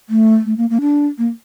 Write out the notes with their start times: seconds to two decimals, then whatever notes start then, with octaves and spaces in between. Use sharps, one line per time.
0.10 A3
0.45 A3
0.58 A#3
0.70 A#3
0.81 D4
1.18 A#3